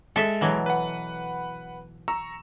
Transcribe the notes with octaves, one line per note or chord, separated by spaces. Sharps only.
G#3 A4 E5
B2 E3 F#3
B4 F#5
A#5 C#6 E6